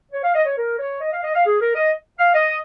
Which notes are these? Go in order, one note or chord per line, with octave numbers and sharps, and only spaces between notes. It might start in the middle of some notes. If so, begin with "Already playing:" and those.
C#5
F5
D#5
C#5
A#4
C#5
D#5
F5
D#5
F5
G#4
A#4
D#5
F5
D#5